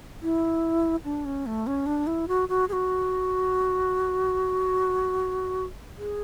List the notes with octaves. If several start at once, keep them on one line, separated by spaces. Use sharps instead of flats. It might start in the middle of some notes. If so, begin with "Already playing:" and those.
E4
D4
C#4
A3
C#4
D4
E4
F#4
F#4
G#4
F#4
G#4